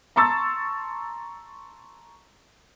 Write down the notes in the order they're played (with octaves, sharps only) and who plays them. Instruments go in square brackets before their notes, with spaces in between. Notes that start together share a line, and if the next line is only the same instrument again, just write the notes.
[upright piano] A5 A#5 C6 C#6 E6 A6